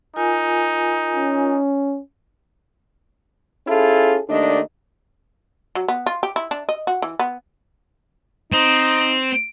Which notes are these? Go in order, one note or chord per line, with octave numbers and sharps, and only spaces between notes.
D#4 F4 A#4 G#5
C#4
C#4 E4 F4 G#4 A4
D#2 D#3 A3 D4 D5 D#5
F#3
B3
F4
G4
E4
D4
D#5
F#4
E3
B3
C4 D#4